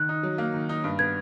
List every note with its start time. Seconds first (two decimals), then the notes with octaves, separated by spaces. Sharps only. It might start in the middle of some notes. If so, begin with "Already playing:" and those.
Already playing: D#3 F#6
0.09 D#4
0.23 F#3
0.38 A#3
0.54 D#3
0.69 D#4
0.84 G2
0.99 B3 G#6